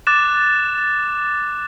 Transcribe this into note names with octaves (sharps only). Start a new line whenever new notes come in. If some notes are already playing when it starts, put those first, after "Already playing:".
D6 F#6 A6 E7